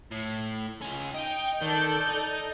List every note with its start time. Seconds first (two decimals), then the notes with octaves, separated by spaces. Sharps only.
0.11 A2
0.81 C#2 C#4
1.14 D#4 G5
1.62 D#3 A4 D5 G6
2.08 D#4